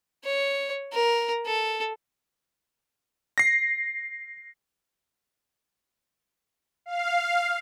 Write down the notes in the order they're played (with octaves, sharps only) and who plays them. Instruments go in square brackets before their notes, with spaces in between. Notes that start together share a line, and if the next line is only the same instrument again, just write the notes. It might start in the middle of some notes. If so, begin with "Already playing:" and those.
[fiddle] C#5
A#4
A4
[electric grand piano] A#6 C7
[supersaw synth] F5